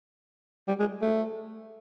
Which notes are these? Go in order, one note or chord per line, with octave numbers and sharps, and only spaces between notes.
G3
G#3
A3